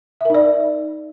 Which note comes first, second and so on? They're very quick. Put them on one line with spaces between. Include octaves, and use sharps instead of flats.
E5 A#4 D#4 D5